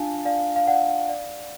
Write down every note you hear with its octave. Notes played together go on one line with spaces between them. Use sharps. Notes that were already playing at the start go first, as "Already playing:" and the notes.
Already playing: D4 F4 F5 G#5 A5
D5 F5
F5
D5 F#5
D5